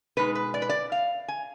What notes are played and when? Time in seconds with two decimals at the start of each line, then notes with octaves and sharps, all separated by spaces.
0.17 B2 G#3 D#4 B4
0.35 B4
0.54 D5
0.62 B4
0.69 D5
0.92 F5
1.28 G#5